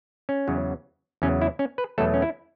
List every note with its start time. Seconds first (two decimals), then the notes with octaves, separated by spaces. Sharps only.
0.29 C#4
0.47 E2 C#3 F#3
1.22 E2 C#3 F#3 C#4
1.42 E4
1.59 C#4
1.78 B4
1.98 E2 B2 F#3 A3 A4
2.14 C#4
2.22 E4